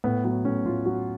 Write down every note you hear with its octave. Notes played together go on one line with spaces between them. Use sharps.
A2 B3
F#3 B3
A2 C#4
A2 F4
F#3 F#4